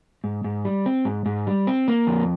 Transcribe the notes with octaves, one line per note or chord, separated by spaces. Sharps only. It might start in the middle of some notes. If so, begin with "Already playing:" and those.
G#2
G#2
G3
C4
G#2
G#2
G3
C4
A#3
F2